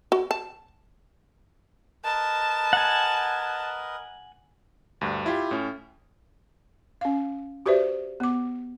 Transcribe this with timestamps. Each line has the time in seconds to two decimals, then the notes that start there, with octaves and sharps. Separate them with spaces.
0.12 F#4
0.31 A5
2.05 A#4 B4 D#5 A5
2.73 F#5 G#5
5.01 D2 G2
5.26 E4 F4 G4
5.51 A2 C#4
7.01 C#4 F5
7.66 F#4 G4 B4 C5 D5 E5
8.20 B3 D6